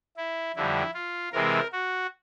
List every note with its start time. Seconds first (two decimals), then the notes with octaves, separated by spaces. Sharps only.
0.17 E4
0.56 F2 D3 G3 E4
0.94 F4
1.32 C3 E3 G#3 C4 A#4
1.72 F#4